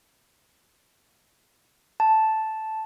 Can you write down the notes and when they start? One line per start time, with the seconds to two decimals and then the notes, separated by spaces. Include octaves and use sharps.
2.00 A5